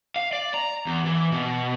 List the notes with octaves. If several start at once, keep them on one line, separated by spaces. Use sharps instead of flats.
F5
D5
A#5
E2
E3
B2